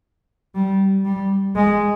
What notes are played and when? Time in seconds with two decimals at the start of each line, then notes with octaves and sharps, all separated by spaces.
0.55 G3
1.05 G3
1.55 G#3